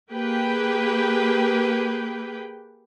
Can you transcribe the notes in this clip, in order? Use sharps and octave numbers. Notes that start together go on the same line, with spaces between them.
A#3 G4 G#4 B4 G5